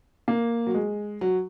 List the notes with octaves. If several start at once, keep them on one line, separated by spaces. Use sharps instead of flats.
A#3
F#3
G#3
F#3